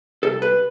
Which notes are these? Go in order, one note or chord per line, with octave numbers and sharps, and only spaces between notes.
C2 A4
B4